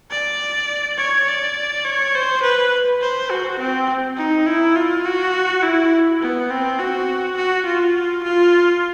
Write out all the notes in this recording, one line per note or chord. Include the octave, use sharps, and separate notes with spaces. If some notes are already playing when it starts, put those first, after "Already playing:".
D5
C#5
D5
C#5
C5
B4
C5
F#4
C4
D#4
E4
F4
F#4
E4
B3
C4
F#4
F#4
F4
F4